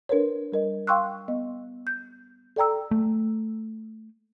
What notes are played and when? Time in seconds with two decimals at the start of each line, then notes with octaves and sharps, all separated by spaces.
0.09 D4 A#4 B4 C#5
0.52 G3 A#4 D#5
0.87 F5 G5 C6 C#6 E6 F#6
1.28 B3 D#5
1.87 G6
2.56 A4 D5 G5 A#5 E6
2.91 A3